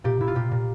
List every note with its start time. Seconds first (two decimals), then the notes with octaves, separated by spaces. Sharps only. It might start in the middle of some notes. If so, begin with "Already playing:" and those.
0.04 A#2 G4
0.20 A#2 E4
0.28 F4
0.35 A#2 G4
0.51 A#2